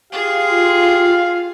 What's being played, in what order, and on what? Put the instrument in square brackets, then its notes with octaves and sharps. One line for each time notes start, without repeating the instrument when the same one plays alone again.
[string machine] F4 [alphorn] G4 [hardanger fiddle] G#4 [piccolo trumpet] F5